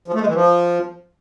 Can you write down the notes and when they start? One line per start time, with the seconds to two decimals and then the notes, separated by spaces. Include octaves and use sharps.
0.08 F3
0.14 A3
0.21 G#3
0.27 E3
0.34 F3